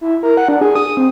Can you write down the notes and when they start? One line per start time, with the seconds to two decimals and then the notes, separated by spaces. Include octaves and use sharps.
0.01 E4
0.23 A#4
0.37 F#5
0.48 D4
0.61 G#4
0.75 D#6
0.97 C4